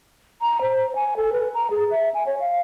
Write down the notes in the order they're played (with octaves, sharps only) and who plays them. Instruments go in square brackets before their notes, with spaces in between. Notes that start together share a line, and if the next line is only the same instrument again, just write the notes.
[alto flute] A#5
C5
G#5
A4
B4
A#5
G#4
E5
G#5
C#5
F5